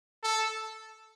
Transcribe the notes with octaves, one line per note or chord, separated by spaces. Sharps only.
A4